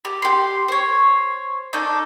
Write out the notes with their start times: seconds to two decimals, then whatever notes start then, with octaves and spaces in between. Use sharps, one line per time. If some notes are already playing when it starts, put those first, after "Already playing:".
0.05 G4
0.22 G4 C6
0.68 C5 C#5
1.73 D4 D#4 A4